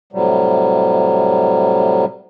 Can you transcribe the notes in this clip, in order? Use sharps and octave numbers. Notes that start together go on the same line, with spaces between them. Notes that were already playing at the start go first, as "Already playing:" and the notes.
A2 C3 F#3 G3